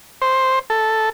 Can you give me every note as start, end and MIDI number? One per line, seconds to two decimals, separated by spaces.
0.22 0.59 72
0.70 1.10 69